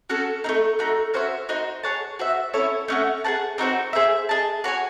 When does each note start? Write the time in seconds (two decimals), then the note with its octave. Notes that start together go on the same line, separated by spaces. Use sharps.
0.10 C#4 F#4 A4
0.44 C4 D#4
0.49 A3
0.79 A3 D#4 F#4
1.14 C#4 F#4 C5 E5
1.49 D#4 F#4 C5 D#5
1.83 G#4 C#5 F#5 A5
2.19 F#4 C5 E5
2.53 C#4 E4 A4 C#5
2.88 A3 C#4 F#4
3.24 G#4 C5 F#5 A5
3.58 C4 D#4 F#4 C5
3.93 G#4 C5 E5
4.29 G#4 D#5 A5
4.64 F#4 C#5 G#5